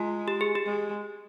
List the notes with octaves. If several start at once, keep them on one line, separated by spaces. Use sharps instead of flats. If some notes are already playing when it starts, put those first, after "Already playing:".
Already playing: G#3 F4
G4
G#4
G4
G#3